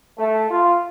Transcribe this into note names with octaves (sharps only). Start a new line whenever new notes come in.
A3
F4